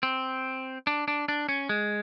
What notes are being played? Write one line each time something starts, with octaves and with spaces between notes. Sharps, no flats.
C4
D4
D4
D4
C#4
G#3